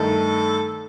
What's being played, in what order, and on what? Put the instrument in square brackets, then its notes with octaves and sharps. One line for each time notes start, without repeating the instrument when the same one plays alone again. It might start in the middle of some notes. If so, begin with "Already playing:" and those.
Already playing: [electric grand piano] G2 D#3 A3 D#4 [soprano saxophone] A4